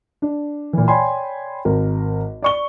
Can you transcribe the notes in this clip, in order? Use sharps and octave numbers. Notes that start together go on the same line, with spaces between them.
D4
A#2 E3
C#5 D5 G5 G#5 B5 C6
G#1 A#4
D5 C#6 G7